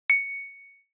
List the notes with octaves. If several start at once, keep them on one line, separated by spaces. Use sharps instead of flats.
C#7